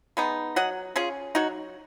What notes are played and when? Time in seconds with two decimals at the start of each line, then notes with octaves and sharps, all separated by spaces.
0.17 G#3 B3 D#4
0.56 F#3 D#5 F#5
0.96 C#4 F4 G#4
1.35 F#3 D#4 F#4